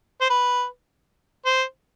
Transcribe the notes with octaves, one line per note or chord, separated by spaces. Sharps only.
C5
B4
C5